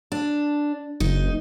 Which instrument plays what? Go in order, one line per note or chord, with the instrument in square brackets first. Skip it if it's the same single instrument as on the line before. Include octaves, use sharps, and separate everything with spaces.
[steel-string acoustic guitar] D4
[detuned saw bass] F#1 [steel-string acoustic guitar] D#4